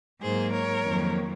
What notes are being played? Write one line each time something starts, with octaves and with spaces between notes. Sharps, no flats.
G#2 F#3 A#3 G#4 C5
A#4 C#5
F2 D#3 F#3 A#3